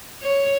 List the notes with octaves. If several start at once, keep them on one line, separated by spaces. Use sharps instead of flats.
C#5